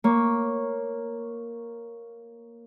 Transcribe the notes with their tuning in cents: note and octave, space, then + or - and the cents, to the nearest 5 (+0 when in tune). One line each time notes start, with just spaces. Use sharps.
A#3 +0 C#5 +0